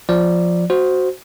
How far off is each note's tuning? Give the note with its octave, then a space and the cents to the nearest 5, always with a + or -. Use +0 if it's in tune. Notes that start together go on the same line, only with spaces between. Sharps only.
F3 +0 D5 +0
F#4 +0 C5 +0